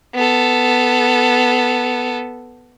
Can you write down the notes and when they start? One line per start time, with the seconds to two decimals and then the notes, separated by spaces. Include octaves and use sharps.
0.14 B3 A4